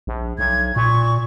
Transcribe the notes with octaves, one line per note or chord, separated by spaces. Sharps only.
A#1
B1 G#6
A#2 C#6